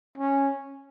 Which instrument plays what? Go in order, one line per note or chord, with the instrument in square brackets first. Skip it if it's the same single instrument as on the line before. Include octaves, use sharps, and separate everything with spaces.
[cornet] C#4